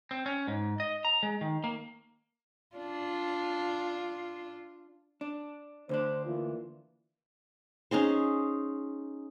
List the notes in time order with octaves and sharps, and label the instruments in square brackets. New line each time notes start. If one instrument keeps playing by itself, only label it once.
[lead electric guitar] C4
C#4
G#2
D#5
A#5
G#3
D#3
A#3
[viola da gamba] D4 F4
[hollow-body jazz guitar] D4
[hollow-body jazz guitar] D2 D3 D4 [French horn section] C5
[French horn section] E3 A#3 F4
[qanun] C#4 D#4 G#4 C5